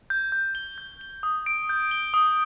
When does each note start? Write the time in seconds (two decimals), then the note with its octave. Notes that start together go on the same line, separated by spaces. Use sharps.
0.10 G6
0.32 G6
0.55 G7
0.78 G6
1.01 G7
1.23 D#6
1.46 D7
1.69 G6
1.91 G7
2.14 D#6